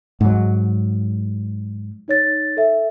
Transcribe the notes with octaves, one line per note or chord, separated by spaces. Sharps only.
G#2 F#3
D#4 C#5 A6
A4 E5